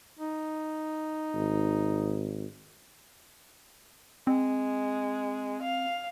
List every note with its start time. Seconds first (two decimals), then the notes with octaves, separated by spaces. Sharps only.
0.19 D#4
1.34 G#1
4.27 G#3 C4
5.63 F5